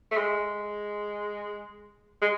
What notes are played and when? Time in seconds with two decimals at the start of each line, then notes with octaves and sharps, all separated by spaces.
0.11 A3
0.17 G#3
2.22 G#3